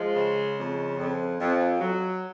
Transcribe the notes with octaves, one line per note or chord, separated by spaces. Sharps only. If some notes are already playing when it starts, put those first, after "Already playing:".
Already playing: F3 G#3
C#3
F2
F2
F2
F#3